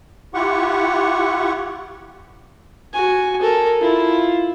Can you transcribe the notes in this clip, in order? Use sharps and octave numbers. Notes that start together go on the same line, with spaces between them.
E4 F4 G4 F#5 C#6
F#4 G#5
A4 A#4
E4 F4